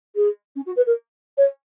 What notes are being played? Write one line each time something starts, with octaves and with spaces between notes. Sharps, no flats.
G#4
C#4
F#4
B4
A#4
C#5